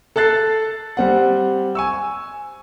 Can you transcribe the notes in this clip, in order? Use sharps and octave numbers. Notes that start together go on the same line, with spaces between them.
A4 A5 F#6 A6 C7
G3 C4 F#5
G#5 C#6 E6